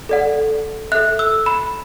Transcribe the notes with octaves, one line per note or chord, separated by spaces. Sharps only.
A4 D5 F#5
A4 E5 F#6
E6
B5